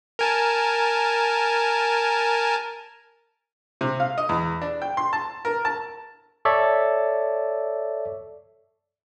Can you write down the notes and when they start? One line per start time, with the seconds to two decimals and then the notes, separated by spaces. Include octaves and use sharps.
0.19 A#4 G#5 A5
3.81 C3
4.00 F5
4.18 D#5
4.29 E2
4.62 D4
4.82 G5
4.97 C6
5.13 A5
5.45 A#4
5.65 A5
6.45 A4 C#5 D5 E5